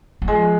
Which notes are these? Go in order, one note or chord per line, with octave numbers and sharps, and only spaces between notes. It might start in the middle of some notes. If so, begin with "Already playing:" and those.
F#3
F3 G#3